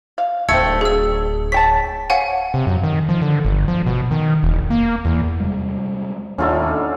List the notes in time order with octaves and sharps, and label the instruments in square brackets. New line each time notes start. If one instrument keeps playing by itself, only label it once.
[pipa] F5
[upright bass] D1 [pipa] A3 C4 [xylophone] E6 G#6 C#7
[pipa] D4 [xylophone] G#4 E6
[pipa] C#5 G5 A5 [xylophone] B6
[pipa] C#5 [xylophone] F5 F#5 G#5
[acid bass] C3
F#2
D#3
F3
D3
G1
F3
B2
D#3
E1
A#3
E2
[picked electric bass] C3 G3 G#3
[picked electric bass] D#2 [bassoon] A2 [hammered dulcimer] D3 D#4 D5 [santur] C#4 F4 A4